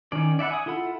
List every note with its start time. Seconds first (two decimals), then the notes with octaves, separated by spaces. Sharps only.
0.12 D#3 C#4 D5
0.39 D5 E5 F#5 B5
0.51 G#5 D#6
0.66 E4 F4 A4 F#5 B5